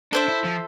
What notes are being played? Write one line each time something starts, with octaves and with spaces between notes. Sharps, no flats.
D4 A4 C5 E5
E4
F3